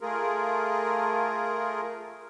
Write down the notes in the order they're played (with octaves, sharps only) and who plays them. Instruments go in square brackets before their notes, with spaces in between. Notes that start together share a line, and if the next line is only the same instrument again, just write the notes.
[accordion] A3 F4 G#4 A#4